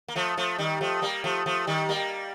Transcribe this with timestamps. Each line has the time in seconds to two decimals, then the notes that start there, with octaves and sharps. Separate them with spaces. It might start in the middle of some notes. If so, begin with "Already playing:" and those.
0.08 A#3
0.16 F3 A3
0.37 F3 A3
0.58 D#3 G3
0.81 F3 A3
1.02 G3 A#3
1.24 F3 A3
1.46 F3 A3
1.67 D#3 G3
1.89 G3 A#3